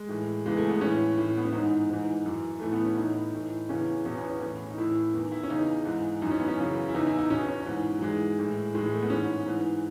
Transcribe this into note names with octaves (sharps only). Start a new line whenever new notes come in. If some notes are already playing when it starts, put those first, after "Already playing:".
Already playing: G#3
A2 E3
E2 C#3 E3 G#3
A3
B3
A2 E3 C#4
A2 E3
B3
C#4
G#2 E3 D#4
G#2 E3
F#2 E3
A2 E3 A3
B3
C#4
A2 E3 D#4
A2 E3
E2 C#3 E3 C#4
E2 B2 C#4
B3
C#4
A2 E3
D#4
A2 E3 E4
E2 D#3
E4
C#4
E2 C#3 E3 D#4
G#2 E3
F#2 E3 D#4
C#4
B3
C#4
F#2 C#3 E3
E4
E2 C#3 E3 D#4
E4
D#4
E2 B2 C#4
C#4
G#2 E3
F#3
G#2 E3 G#3
A2 E3
A2 E3 G#3
G#3
A3
B3
G#2 E3 C#4
G#2 E3